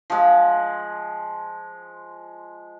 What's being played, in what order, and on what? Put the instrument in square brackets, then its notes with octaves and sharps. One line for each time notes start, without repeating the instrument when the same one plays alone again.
[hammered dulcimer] F3 G#3